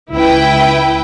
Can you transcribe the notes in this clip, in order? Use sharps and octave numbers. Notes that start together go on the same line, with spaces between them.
C#2 E4 B4 G5